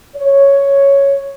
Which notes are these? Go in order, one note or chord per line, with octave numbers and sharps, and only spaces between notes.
C#5